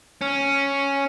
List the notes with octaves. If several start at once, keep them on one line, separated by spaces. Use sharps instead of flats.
C#4